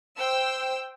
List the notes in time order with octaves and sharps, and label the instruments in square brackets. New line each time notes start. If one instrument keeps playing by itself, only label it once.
[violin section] C5 G5 E6